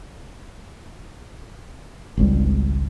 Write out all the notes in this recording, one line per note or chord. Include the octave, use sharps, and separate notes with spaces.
G#1 C#2 G#2 G3